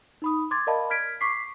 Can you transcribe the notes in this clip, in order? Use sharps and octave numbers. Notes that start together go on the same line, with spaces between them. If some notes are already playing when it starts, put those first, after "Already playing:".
D#4 B5 D#6
C6 D6 G#6 A6
A#4 D5 D#5 F5 A5 B5
F6 G#6 B6 D7
C#6 D6 B6 C7